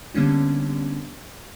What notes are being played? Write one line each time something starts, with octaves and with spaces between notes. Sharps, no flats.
D3 G3 A#3 B3 C#4 D4